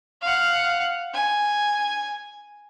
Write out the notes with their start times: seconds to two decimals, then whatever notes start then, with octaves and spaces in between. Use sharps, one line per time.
0.22 F5 F#5
1.14 G#5